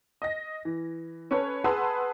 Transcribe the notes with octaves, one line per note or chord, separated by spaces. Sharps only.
D#5 A#6
E3
C#4 A4 B4 C#5
G#4 B4 F#5 A5 C6 E6